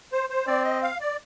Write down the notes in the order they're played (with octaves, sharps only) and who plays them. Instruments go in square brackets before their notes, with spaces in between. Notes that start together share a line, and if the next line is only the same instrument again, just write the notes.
[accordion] C5
C5
[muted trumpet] C4 [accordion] D5
[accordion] D#5
F5
D5